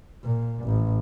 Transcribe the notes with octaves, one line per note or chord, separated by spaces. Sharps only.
A#2
A1